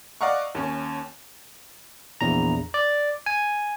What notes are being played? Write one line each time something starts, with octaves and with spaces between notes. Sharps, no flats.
D5 D#5 F5 F#5 A#5 C#6
D#2 C#4
A#1 E2 A#5
D5
G#5